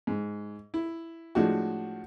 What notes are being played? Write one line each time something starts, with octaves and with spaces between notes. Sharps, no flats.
G#2
E4
A2 F3 G#3 D4 F#4